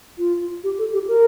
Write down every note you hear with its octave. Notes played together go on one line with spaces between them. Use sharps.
F4
G4
A4
G4
A#4